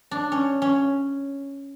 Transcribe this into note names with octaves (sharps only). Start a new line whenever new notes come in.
D4
C#4
C#4